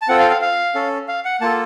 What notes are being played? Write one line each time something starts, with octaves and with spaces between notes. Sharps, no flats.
A5
C4 F4 A4 F#5
F5
F5
F5
C#4 A4
F5
F#5
A#3 F4 A4 A5